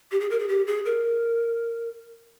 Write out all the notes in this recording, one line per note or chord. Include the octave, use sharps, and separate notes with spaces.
G4
G#4
A#4
G#4
G4
G#4
A#4